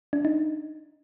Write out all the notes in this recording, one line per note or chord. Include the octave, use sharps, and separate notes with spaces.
D4
D#4